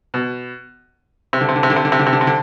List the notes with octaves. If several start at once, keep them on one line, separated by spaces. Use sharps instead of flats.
B2
C3
D3
C3
D3
C3
D3
C3
D3
C3
D3
C3
D3
C3
D3